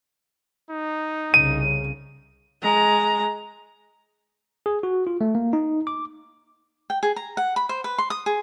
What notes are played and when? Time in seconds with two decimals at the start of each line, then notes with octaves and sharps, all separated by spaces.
0.70 D#4
1.34 C2 C#3 D#7
2.62 G#3 A#5
4.66 G#4
4.83 F#4
5.07 F4
5.21 A3
5.35 A#3
5.53 D#4
5.87 D6
6.90 G5
7.03 G#4
7.16 A#5
7.37 F#5
7.56 B5
7.69 C5
7.84 B4
7.98 C6
8.10 D#6
8.26 G#4